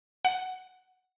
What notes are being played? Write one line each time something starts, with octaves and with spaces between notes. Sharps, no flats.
F#5